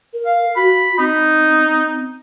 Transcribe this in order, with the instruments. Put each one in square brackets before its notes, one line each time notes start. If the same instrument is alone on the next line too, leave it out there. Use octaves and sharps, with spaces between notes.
[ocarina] A#4
[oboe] F5
[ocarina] F#4 [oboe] B5
[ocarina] C4 [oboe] D#4